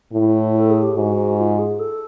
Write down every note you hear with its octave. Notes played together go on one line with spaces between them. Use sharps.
A2 E4
A4
G#4
G4
G#2 F#4
F4
G#4
A4